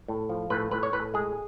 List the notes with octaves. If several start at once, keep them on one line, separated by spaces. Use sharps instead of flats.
A2
F3
A2 B4
A2 B4
C#5
A2 B4
G#3 G#4